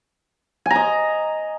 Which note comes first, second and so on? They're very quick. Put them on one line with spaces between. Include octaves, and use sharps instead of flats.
G#5 A#5 D#5